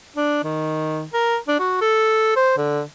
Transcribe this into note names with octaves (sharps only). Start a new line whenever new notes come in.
D4
D#3
A#4
D4
F#4
A4
C5
D3